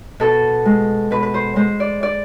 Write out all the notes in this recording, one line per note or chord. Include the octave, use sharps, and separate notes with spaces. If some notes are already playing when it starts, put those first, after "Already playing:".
B2 A4
G#3
B2 B4
B4
C5
G#3 C5
D5
D5